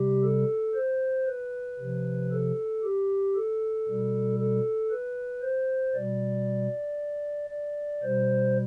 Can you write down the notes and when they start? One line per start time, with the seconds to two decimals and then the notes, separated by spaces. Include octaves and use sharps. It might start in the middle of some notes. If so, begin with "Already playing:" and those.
Already playing: C3 G3 G4
0.24 A4
0.75 C5
1.27 B4
1.79 C3 F3
2.32 A4
2.84 G4
3.36 A4
3.88 B2 G3
4.39 A4
4.91 B4
5.42 C5
5.95 B2 G3 D5
7.50 D5
8.03 B2 G3 C5